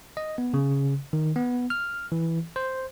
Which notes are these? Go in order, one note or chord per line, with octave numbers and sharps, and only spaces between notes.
D#5
B3
C#3
D#3
B3
F6
E3
C5